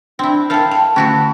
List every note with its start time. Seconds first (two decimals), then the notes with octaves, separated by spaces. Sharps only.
0.19 C4 D4 E4
0.50 E4 A4 A#4 F5 G5 A5
0.72 G5 A5
0.96 D3 A3 C#4 E4 F#4 G4